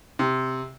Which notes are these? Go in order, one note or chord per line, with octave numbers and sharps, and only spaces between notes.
C3